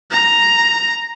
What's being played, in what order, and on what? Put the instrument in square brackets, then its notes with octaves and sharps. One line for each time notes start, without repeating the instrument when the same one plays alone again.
[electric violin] A#5